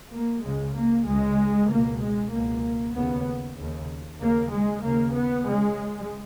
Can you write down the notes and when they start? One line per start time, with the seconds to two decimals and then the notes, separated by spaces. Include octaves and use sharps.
0.12 A#3
0.43 C#2 C#3 G#3
0.76 A#3
1.07 C#2 C#3 G#3
1.69 C#2 B2 A#3
2.01 G#3
2.32 C#2 B2 A#3
2.95 D#2 C#3 B3
3.58 D#2 C#3
4.21 D#2 C#3 A#3
4.52 G#3
4.84 D#2 C#3 A#3
5.16 B3
5.47 C#2 C#3 G#3